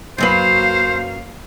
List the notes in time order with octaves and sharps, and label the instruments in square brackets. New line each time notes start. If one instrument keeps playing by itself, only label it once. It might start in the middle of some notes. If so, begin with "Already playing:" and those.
[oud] F#2 F#3 B4 [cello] A#3 F5 [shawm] C5